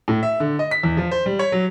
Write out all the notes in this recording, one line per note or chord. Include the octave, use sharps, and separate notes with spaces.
A2
E5
D3
D#5
B6
E2
F3
C5
G3
C#5
F#3